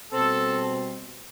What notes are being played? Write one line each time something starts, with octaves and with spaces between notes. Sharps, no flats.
B2 G3 C4 A4